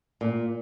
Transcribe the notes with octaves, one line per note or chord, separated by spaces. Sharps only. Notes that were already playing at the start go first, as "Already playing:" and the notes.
A#2